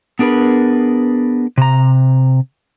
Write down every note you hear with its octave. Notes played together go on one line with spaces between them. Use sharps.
B3 D4 G#4 A#4 B4
C3 A#5